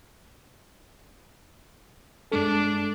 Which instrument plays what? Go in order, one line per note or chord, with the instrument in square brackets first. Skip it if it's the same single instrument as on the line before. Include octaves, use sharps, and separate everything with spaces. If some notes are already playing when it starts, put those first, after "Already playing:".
[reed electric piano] G2 G#3 A4 [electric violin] D4